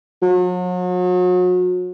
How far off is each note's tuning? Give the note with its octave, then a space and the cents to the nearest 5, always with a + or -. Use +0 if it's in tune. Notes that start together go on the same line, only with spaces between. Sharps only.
F#3 -40